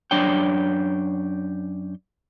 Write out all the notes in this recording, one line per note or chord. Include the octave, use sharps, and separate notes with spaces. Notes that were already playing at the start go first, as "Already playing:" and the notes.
F#2 D4 C#5 G5